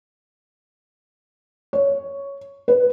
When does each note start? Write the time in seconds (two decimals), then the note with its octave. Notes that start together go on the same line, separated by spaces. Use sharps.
1.73 C#5
2.68 B4